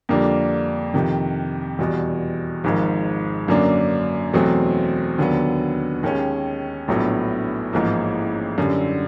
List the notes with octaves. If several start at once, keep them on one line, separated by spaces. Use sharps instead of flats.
F2 D3 G3 A#3 D4
F2 C3 D#3
E2 B2 G3
G#1 G#2 F3
F#2 D3 F#3 A#3 D4
E2 B2 F#3 A3 C4
D#2 D3 F#3 B3
D#2 D#3 G#3 C#4
A#1 A2 F#3 B3 D4
A1 G#2 F3 A#3
F#2 D3 G3